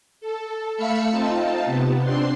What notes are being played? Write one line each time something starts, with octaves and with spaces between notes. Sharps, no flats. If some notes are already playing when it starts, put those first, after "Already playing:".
A4
A3 E5 F5 B5 E6 C#7
C4 D#4 F4 A5
C3 B3
C4 D4 C6